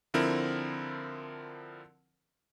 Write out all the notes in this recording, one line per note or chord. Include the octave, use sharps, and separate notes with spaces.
D3 F3 C4 E4 A#4